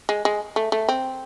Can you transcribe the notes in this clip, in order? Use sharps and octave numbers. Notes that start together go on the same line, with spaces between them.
G#3
G#3
A3
A3
C4